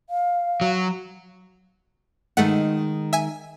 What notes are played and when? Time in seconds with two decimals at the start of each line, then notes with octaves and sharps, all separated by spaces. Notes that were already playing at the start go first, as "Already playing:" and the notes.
0.10 F5
0.61 F#3
2.37 D#3 G#3 A3 D#4 F#5
3.13 E5 G#5